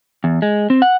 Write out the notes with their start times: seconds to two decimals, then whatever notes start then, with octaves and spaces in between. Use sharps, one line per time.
0.24 E2
0.42 G#3
0.70 C4
0.82 F#5